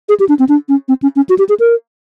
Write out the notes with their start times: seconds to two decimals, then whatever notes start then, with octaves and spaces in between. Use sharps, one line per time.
0.09 G#4
0.20 G4
0.29 D4
0.39 C4
0.49 D4
0.69 C#4
0.88 C4
1.02 C#4
1.16 C#4
1.29 F#4
1.38 G4
1.49 G#4
1.60 A#4